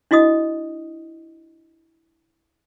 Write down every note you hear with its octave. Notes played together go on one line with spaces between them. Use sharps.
D4 E4 F#4 D#5 D#6